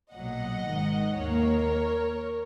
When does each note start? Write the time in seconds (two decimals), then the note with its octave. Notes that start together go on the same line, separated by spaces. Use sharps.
0.14 B1 A#2 F#3 D#5 F#5
0.67 G#1 G#2 D#3
1.19 D#2 D#3 A#3 A#4 C#5